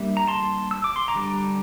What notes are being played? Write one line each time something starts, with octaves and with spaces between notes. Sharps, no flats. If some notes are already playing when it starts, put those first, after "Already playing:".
Already playing: G3 A#3 D4 E5
A#5
A5 C6
E6
D6
C6
A#5 D6
D3 G3 D4